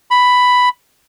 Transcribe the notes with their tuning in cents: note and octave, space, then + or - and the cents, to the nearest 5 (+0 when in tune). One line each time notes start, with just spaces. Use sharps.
B5 +5